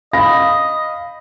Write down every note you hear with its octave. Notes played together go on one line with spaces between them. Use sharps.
D#5 F5 B5 A#6